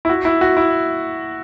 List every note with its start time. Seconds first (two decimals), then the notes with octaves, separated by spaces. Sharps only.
0.05 E4
0.09 F#4
0.25 E4
0.41 F#4
0.57 E4